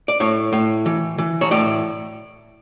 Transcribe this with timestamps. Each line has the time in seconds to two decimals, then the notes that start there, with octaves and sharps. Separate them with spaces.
0.08 D5
0.20 A2 C#5
0.53 A2
0.86 E3
1.18 E3
1.41 C#5
1.51 A2 D5